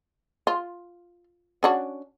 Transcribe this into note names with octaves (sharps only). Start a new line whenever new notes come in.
F4
C#4 D4 F#4